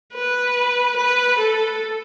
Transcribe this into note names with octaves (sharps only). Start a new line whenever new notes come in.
B4
B4
A4